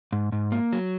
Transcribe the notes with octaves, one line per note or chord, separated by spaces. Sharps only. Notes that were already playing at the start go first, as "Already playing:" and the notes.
G#2
G#2
A#3
F#3